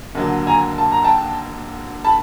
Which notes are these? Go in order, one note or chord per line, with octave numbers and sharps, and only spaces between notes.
D#2 D3 F#3
G#5 A#5
A5
A#5
G5 A5
A5 B5